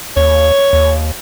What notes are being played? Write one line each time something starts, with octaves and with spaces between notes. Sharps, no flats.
D#2 C#5
D#2